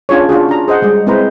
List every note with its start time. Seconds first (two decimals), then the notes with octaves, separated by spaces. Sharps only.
0.09 C#4 D4 F4 G#4 C#5
0.29 D4 F4 F#4 G#4
0.49 D4 A#5
0.68 G#4 C5 D#5 F#5
0.82 G3 G#3 G#4
1.07 G#3 C4 E4 B4 C5 A#5